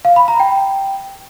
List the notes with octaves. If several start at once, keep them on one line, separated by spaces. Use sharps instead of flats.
F5
B5
A#5
G5